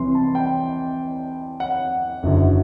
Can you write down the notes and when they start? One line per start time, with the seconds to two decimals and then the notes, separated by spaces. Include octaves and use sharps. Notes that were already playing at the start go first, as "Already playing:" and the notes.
Already playing: C2 C3 E3 C6
0.15 A5
0.35 G5
1.60 F#5
2.23 F#1 F#2 D3